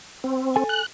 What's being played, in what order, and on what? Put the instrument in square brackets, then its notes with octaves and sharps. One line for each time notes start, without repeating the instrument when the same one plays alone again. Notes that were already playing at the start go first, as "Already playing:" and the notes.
[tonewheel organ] C4
[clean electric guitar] A4 G#5
[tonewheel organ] F#6